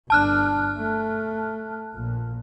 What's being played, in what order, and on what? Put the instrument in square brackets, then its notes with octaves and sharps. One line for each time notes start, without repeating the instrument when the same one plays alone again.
[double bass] G1 D4 [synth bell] A5 F6 F#6
[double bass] A3
A#1 A#2